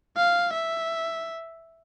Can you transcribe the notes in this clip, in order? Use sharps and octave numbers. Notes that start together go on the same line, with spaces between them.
F5
E5